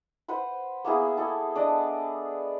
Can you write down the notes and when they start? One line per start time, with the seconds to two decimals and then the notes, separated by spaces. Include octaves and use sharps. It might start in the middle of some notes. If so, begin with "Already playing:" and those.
0.28 B4 C5 F#5 C6
0.85 A#3 B3 E4 G#4
1.17 E4 G#4 A4
1.55 D4 D5 D#5